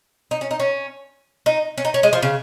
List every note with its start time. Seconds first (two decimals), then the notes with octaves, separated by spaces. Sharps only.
0.31 D#4
0.41 C#4
0.51 D#4
0.60 C#4
1.46 D#4
1.78 C#4
1.85 D#4
1.94 C#4
2.03 G#3
2.13 F3
2.23 C#3